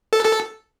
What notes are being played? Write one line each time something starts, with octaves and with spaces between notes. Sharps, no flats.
A4
A4